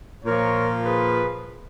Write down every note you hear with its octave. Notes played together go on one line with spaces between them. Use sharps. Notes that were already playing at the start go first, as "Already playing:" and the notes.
A#2 F3 A#4 C#5
G#4 B4